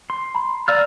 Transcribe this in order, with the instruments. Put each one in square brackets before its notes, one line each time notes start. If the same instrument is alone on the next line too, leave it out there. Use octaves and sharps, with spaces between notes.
[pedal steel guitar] C6
[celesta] A#5 B5
[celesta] D5 F5 A6 [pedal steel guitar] A#5 E6 F6